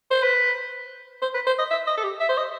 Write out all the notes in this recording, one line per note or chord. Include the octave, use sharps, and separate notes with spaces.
C5
B4
C5
B4
C5
D#5
E5
D#5
A4
G4
E5
C5
D#5